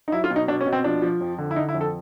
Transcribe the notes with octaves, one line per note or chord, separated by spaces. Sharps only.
D#4
F#3 E4
F4
B2
D#4
B2 D4
C#4
B2
C4
F3 D4
F3
F2
D3
E4
D3 D#4
E4
F2
A4